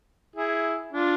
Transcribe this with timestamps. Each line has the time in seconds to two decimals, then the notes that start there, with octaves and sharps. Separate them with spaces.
0.36 E4 G#4
0.92 D4 F4